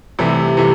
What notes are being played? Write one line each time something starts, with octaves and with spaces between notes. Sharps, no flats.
C2 C3 E3 A3 E4
C3 E3 A3 E4